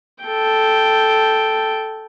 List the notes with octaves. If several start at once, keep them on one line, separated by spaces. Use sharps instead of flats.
A4 G5